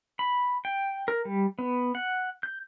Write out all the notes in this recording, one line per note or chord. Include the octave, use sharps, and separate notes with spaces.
B5
G5
A#4
G3
B3
F#5
G6